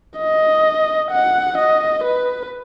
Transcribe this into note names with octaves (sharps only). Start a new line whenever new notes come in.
D#5
F#5
D#5
B4